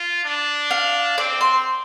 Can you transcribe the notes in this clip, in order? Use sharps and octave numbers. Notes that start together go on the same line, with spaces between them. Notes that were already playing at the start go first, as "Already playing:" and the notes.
Already playing: F4
D4
F5
C4 D5
C6